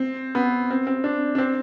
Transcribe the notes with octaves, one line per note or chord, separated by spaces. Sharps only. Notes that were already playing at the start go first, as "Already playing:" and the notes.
Already playing: C4
B3
C4
C4
D4
D4
C4